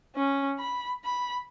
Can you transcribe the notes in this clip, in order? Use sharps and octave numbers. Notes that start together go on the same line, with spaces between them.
C#4
B5
B5